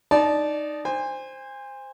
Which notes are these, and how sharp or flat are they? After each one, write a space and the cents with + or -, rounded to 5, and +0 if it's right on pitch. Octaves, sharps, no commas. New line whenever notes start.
D#4 -10 D5 +0 A5 -20
C5 +0 G#5 -35